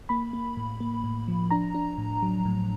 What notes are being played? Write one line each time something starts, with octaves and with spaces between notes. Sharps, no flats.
A#3 B5
A#3
A2
A#3
A2
F3
D4 A#5
D4
A2
F#3
A2